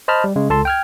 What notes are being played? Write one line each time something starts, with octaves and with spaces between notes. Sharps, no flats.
C5 D#5 A5 B5 F6
G3
C#3 G#3
C#2 A4 A5 C6
G5 F6 G#6